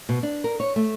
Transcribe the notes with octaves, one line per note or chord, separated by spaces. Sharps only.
B2
D4
A#4
C#5
A3